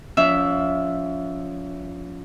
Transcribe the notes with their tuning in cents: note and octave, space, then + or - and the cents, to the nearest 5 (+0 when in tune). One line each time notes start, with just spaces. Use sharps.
F3 +15 C#4 +35 E5 +0